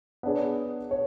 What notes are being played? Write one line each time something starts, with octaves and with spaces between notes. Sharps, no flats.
B3 D4 G#4 C#5
C#5